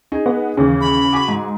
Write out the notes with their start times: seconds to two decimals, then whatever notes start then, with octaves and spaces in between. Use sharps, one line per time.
0.12 D#4 G#4
0.26 B3
0.57 D#2 C#3 E3
0.81 B5
1.13 F#4 G#5 D6
1.28 G#2